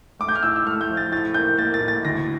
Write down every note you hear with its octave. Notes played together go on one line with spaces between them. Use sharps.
A3 D6
G6
F6
A2 E6
E6
A3 F6
G6
F3
A6
A2 A6
A#3 G6
A#3 A6
A6
A2
A6
D2 A#6